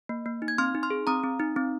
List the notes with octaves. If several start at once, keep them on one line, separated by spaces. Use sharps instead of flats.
A#3
A#3
D#4
G#6
C4 C6 F6
D#4
C6 F6
G#4
C4 A#5 D#6
C4
D#4
C4